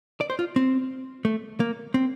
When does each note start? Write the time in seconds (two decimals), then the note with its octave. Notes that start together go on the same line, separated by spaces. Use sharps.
0.21 D5
0.30 C5
0.39 F4
0.56 C4
1.25 A3
1.60 A#3
1.94 C4